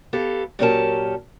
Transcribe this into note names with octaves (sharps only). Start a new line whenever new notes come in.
B3 G4 A4 F5
A#2 F#3 C#4 G4 A#4 A5